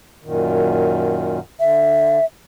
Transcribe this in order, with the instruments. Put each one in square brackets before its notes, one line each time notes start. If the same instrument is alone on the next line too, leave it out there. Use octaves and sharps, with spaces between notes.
[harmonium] F#2 A#2 D#3
[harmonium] D3 [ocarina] E5